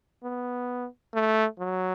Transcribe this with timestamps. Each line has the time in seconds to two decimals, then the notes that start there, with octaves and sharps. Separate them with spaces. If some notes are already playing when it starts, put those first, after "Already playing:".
0.23 B3
1.14 A3
1.59 F#3